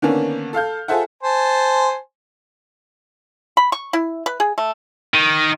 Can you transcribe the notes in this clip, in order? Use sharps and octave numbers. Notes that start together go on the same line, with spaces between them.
D3 D#3 A#3 B3 C#4 D4
A4 F5 F6 G6
F4 G#4 A4 C5 E5 F#5
C5 G#5 A5
B5
C#6
E4
B4
G#4
A3
D#3